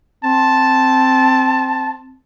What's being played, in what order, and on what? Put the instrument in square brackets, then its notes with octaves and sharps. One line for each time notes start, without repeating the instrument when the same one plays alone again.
[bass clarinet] C4 [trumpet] A5